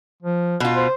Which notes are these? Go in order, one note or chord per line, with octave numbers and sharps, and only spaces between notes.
F3
B2 F4
C5